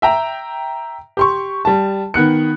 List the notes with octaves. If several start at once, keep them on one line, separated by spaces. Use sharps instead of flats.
E5 G5 A#5
G4 C6 C#6
G3 A5
D#3 B3 F#6 C#7